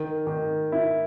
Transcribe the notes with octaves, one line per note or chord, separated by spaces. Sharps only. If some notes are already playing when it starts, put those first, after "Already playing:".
Already playing: D#3
D#3
E4